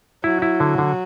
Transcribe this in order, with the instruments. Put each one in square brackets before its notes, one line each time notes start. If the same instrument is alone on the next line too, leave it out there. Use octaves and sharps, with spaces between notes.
[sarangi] F#3 [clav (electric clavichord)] E4
[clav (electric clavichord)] E4
D3
D3